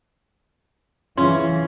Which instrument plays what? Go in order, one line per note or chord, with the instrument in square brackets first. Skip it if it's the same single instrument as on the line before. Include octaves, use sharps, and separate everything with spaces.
[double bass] E3 [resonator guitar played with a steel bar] C#4 [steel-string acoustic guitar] E4 F4 G#4 [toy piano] C6